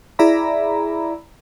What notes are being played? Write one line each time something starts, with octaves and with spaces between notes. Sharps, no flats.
E4 G#4 D5 E5 A#5 B5